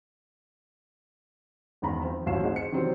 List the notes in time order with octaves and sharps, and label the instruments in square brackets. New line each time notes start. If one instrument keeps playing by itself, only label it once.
[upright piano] E1 E2 D#3 A#5 B5
F3 C4
A1 D#2 F#3 C7 E7
C4 D#4 G#4 F#5
C#7
C3 D#3 E3 F#3 G3 C4